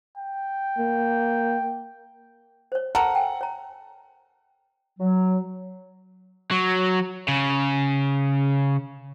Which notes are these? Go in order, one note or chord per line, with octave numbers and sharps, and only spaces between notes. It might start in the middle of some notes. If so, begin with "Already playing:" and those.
G5
A#3
C5 C#5
A4 A#4 F#5
G5 G#5
C#5 A#5
F#3
F#3
C#3